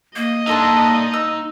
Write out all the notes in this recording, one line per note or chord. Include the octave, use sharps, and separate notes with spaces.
A#3 D#5
D4 D#4 A4 E5 C6
E6